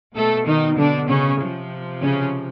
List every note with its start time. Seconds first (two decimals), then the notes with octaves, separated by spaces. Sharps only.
0.15 B2 A3 A4
0.46 D#3 D#4
0.78 D3 D4
1.08 C#3 C#4
1.40 C3 F3
2.02 C#3 C#4